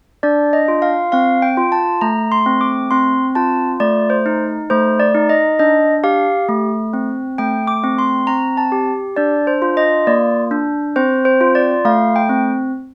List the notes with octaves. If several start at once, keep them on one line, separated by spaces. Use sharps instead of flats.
D4 D5
D#5
F4
F5
C4 F5
G5
F4
A5
A3 A#5
C6
C4
D6
C4 C6
F4 A5
A3 D5
C5
D#4
A3 C5
D5
D#4
D#5
D4 D#5
G4 F5
A3
C4
A3 G5
D6
C4
C6
C4 A#5
A5
G4
D4 D5
C5
F4
D#5
A#3 D5
D4
C4 C5
C5
F4
D5
A3 F5
G5
C4